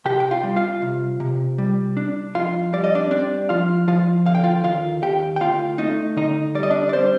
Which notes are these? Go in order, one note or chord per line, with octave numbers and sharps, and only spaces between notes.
C3 G4 G5
G5
F4 F5
G3
F4 F5
C3
C3
G3
D4
F2 F4 F5
G3 D5
D#5
D4 D5
C4 D4 D5
F3 F4 F5
F3 F4 F5
D3 F5
G5
F4 F5
D#2 F4 F5
D#2 G4 G5
G5
D2 F4 F5
A3 D#4 D#5
D3 D#4 D#5
G3 D5
D#5
D4 D5
D5
G3 C4 C5